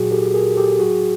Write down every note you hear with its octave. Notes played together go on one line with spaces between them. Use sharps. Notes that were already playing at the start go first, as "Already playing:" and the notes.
Already playing: A#2 F#3 F#4 G#4
G4 A4
G#4 A#4
G4 A4
A2 F#3 F#4 G#4